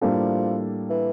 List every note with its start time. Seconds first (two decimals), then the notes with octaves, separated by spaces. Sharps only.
0.01 A2 F3 G3 A#3 D4 A4
0.90 E3